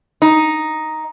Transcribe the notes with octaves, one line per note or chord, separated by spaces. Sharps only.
D#4